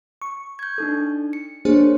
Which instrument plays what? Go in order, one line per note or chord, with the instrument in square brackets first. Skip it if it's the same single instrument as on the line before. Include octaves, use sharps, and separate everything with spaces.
[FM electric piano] C#6
[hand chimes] G6 G#6
D4 D#4 A4
C#7
[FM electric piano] A#3 D4 G#4 [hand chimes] C5 C#5